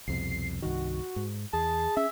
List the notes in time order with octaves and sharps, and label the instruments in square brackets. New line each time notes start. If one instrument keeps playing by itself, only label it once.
[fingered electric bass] C2 F2 B2 [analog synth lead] C7
[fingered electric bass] C2 G2 D#3 [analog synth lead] F#4
[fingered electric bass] G#2
[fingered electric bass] E2 [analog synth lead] G#4 [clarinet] A5
[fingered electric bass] C#4 [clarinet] E5